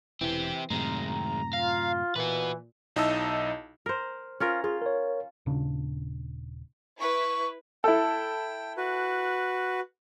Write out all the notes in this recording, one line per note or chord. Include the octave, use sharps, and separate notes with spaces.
E1 E3 C4 G4
F#2 A2 C3 D#3 G#3 A#5
F4 F5
A#2 E3 F#4 B4
B1 D#4 E4 D#5 A5 E6
A#4 C5
C#4 F4 A#4
F4 G#4
A#4 C#5
D#1 A#2 C#3 D4
E4 B4 C#6
E4 A4 G5
F#4 B4